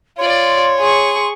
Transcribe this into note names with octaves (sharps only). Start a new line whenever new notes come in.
F4 C#5 D5 C6
G#4 C#6